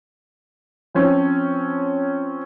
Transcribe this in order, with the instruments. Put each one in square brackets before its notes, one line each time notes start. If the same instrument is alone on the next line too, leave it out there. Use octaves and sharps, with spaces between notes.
[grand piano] F3 C4 C#4